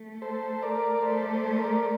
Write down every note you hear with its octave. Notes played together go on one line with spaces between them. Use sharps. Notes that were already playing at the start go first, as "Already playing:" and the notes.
Already playing: A3
A4 C5
A#4 D5
A3 A4 C5
D5
A4 C5
A#4 D5